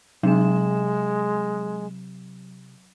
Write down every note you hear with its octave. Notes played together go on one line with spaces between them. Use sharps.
C3 F#3 G#3 E7